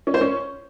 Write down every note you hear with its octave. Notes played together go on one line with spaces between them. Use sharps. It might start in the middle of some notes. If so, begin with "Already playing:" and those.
C#4
C5
C#4